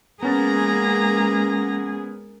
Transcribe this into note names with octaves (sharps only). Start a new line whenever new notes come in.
G#3 A#3 B3 C#4 G#4 A#5 A6